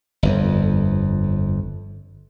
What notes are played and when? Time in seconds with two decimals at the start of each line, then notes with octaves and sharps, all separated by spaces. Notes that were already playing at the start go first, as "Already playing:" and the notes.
0.23 G1 F2